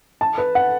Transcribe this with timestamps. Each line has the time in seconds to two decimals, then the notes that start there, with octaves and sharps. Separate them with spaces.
0.21 A5
0.38 B4
0.55 F#5